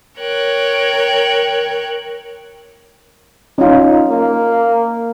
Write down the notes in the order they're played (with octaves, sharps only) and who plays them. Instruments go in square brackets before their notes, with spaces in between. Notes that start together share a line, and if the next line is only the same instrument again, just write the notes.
[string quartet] A#4 C#5 G5 F#6
[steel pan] C#4 F4 [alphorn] D#4
[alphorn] A#3